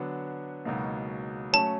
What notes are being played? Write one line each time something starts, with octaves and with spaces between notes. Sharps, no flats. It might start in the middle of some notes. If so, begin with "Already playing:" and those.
Already playing: D3 F#3 B3 D4
C#2 B2 F#3 A#3 D#4
F#3 A3 C#4 A5